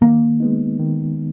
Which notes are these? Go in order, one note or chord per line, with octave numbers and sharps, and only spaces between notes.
D#3 A#3
G#3 B3 D#4
D#3